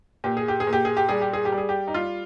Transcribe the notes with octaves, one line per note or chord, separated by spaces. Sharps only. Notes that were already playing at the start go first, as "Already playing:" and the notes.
A#2 G4
G#4
G4
G#4
A#2
G4
G#4
G4
G3 G#4
G4
G#4
G4
G3
G#4
G4
D#4
G3 F4